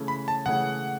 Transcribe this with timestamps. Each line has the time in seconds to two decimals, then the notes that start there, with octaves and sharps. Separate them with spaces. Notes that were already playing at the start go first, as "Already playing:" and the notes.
Already playing: C#3 E3 A3 C#4
0.08 B5
0.28 A5
0.46 C#3 E3 A3 C#4 F#5